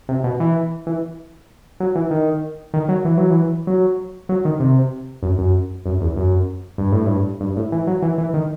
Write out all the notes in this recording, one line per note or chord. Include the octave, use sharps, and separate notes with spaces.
C3
B2
E3
E3
F#3
E3
D#3
D#3
F#3
E3
F#3
E3
F#3
F#3
D#3
C3
F#2
F#2
F#2
E2
F#2
G2
A2
G2
G2
A2
E3
F#3
E3
E3
D#3